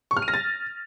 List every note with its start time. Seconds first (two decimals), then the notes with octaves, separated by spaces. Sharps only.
0.11 C#6
0.17 F6
0.22 D#7
0.28 A#6
0.34 A6